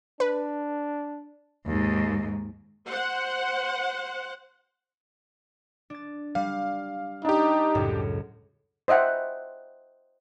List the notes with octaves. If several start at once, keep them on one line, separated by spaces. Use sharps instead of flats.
D4 B4
D#2 G#2
C5 F#5
D4 A6
G3 F5
D4 D#4 G4
C#2 F#2 A2
C5 D#5 E5 F#5 G5